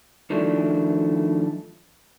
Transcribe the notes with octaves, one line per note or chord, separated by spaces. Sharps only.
D#3 F3 F#3 A3 D4 E4